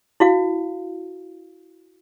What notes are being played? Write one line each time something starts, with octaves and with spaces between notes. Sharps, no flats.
E4 F#4 F5